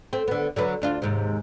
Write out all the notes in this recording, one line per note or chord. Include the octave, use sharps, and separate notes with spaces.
A3 C4
D3 B3
D3 F#3 B4
D2 D4 F4
D#2 G#2 C3